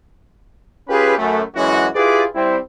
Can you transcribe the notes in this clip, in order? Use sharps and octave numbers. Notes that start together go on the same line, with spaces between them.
C#4 F4 G4 G#4 B4
F#2 A3
F#2 E3 G#3 C#4 E4 F#4
E4 F4 G4 G#4 B4 D5
G3 C4 E4